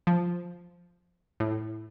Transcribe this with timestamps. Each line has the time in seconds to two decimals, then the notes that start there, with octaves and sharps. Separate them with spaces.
0.07 F3
1.40 A2